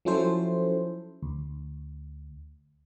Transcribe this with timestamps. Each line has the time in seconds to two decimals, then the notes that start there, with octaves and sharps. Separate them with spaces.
0.05 F3 F#3 C#4 E4 A4 C5
1.23 D2